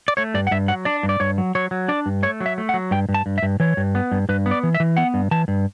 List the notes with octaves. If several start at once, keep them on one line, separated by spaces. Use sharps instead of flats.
D5
A3 C#5
G2 D5
F#5
G2 E5
F#3 F#5
D4 D5
G2
D5
G2 C#5
F#3
F#3 C#5
F#3
D4 D5
G2
A3 C#5
F#3
E5
A3
F#5
F#3
G2 G5
G2
A5
G2
E5
G2
E3 C#5
G2
B3
G2
G2 B4
B3
D5
E3
E5
E3
B3 F#5
G2
E3 A5
G2